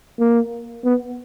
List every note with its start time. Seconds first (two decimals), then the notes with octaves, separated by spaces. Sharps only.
0.20 A#3
0.85 B3